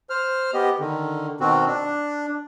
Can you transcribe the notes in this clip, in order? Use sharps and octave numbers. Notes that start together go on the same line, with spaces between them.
C5 F6
B3 G4 D#5
D3 D#3
B2 D#3 C4 F#4
D4